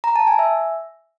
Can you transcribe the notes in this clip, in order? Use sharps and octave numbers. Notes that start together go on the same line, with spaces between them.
A#5
A5
G#5
E5